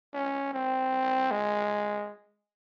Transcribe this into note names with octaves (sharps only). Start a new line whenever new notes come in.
C#4
C4
G#3